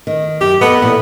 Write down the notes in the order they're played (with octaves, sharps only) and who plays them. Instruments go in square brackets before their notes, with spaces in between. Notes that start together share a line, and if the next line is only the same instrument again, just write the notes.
[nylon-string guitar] D#3
[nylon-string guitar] F#2 [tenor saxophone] G4
[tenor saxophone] B3 [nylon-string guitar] A4 D#5
[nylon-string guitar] A#2 E3 F#5